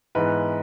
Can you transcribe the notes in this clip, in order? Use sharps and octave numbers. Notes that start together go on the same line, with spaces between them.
G#2 E3 B3 B4